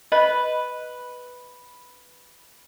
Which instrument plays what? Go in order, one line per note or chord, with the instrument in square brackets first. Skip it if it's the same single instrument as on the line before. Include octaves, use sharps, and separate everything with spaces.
[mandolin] B4 [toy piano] D#5